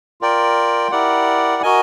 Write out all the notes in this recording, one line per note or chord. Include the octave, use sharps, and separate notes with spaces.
F4 A#4 D5 G5
E4 G4 A#4 D5 F#5
F#4 A#4 D#5 G#5